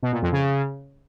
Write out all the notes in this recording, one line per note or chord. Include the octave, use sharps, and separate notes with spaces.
B2
A#2
F2
C#3